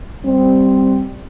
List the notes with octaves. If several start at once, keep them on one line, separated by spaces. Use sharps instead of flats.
G3 C4